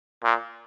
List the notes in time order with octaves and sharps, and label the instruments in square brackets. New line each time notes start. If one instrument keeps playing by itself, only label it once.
[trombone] A#2